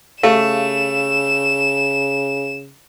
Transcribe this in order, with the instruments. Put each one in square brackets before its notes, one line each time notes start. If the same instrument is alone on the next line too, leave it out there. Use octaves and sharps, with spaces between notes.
[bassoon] C#3 [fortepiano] A3 [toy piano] G4 F5 [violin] E7